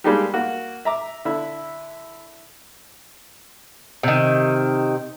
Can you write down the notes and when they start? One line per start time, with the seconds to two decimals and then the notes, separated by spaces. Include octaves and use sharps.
0.04 G3 G#3 A#3 D4 D#4 G4
0.34 A#3 F#4
0.85 E5 A#5 D6
1.25 D3 E4
4.03 C3 D#3